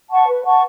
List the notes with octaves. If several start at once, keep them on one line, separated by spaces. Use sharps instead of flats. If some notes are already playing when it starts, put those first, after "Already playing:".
F#5 A5 C#6
B4
F#5 A5 C#6